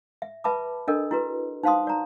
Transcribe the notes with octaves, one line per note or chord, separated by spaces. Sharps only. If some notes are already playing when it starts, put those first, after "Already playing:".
E5
B4 E5 A5 B5 D6
D4 A4 A#4 D#5
E4 F#4 B4
D#4 C5 F5 A5 C6 D#6
D5 A#5